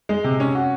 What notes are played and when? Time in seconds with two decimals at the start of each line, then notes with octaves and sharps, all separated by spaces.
0.09 G#3
0.24 C3
0.40 C#4
0.55 F#4